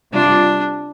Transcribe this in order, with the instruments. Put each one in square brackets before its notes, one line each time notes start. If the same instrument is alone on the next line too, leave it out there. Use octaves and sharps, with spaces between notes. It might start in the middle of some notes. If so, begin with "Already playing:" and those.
[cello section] C3 G3 F4 D5 [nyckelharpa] D4